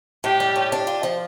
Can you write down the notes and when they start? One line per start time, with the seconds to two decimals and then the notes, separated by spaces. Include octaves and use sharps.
0.24 A2 G4
0.40 G3
0.56 A2
0.72 D4
0.87 F4
1.03 F3